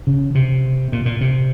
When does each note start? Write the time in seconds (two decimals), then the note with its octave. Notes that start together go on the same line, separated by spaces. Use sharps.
0.07 C#3
0.35 C3
0.92 A#2
1.06 A#2
1.21 C3